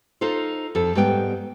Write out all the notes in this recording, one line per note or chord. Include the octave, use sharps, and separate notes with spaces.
D#4 F4 A4 C5
F2 A4
G#2 G3 B3 G5